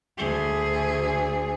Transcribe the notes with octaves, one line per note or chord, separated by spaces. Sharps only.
D2 G#4